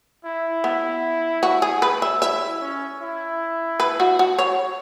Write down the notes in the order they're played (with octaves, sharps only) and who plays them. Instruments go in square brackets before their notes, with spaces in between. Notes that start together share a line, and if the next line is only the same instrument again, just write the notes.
[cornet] E4
[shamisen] B3
F#4
G#4
B4
E5
[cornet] E4 [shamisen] E5
[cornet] C#4
E4
[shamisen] B4
F#4
F#4
C#5